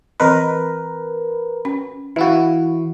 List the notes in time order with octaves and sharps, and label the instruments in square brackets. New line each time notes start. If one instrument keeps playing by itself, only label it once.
[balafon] E3 C4 D#5 [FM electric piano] A#4 B4
[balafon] C#4
[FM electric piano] E3 E4 F#4 [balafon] E5 F5